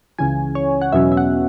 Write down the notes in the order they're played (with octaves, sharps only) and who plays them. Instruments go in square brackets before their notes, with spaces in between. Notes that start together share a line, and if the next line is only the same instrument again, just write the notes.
[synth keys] C#2 C#3 E3 G#5
C#5
F#5
E2 B2 F#3 C#4 E5
E5
F#5